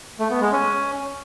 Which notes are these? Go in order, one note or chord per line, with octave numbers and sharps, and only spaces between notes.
A3
B3
G#3
C#4